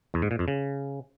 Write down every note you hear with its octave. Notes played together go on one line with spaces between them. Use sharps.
E2
G#2
A#2
F2
C#3